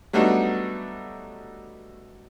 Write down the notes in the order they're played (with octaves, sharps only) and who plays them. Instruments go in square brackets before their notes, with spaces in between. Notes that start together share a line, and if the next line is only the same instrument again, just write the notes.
[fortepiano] F#3 G3 A3 B3 D4 D#4